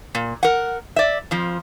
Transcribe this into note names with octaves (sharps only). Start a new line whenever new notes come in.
A#2
A#4 F#5
D5 E5
F2 F3